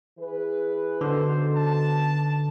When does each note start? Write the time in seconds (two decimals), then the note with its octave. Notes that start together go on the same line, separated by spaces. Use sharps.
0.18 E3 G#4 B4
1.01 B2 D3 D#4 A4 C5
1.56 A5